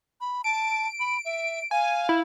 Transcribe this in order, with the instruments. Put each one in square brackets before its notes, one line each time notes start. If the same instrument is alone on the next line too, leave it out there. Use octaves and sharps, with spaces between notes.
[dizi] B5
[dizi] A5 [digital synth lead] D7
[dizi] B5
E5
[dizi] F5 [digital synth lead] G#5
[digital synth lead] E4